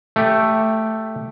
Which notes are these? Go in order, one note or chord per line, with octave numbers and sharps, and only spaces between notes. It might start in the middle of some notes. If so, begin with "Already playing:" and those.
A3 G4